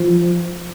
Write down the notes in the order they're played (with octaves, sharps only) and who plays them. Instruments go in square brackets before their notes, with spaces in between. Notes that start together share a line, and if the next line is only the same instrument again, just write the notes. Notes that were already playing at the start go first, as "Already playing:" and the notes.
Already playing: [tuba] F3